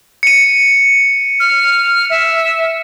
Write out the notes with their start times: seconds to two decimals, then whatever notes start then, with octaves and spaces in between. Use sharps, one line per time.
0.23 C#7 D#7
1.40 F6
2.10 E5